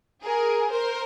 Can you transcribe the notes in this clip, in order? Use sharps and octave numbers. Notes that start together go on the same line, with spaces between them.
G#4 A#4
A#4 C5